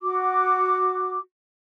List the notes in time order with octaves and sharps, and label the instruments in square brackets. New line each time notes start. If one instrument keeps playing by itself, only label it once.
[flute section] F#4 D6